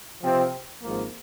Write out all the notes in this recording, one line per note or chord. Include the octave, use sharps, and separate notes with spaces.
C3 F3 C4
G#1 G#2 F3 A#3